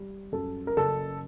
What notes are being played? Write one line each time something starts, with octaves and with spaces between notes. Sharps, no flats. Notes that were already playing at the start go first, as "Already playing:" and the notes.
Already playing: G3
F#2 A4
A#4
F#1 A4